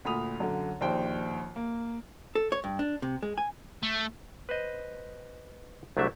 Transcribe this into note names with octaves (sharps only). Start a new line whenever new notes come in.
D2 A#2 B5 D#6 F7
F#2 D3
A#1 D#2 C5 G5
A#3
A4
C#5
G2
D4
C3
G#3
G#5
A3
B4 C5 D#5
C2 F#3 A3 D4 E5